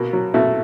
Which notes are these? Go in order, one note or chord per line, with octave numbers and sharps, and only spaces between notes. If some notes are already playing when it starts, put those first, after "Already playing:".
Already playing: B2 A#3
F#3
B2 A3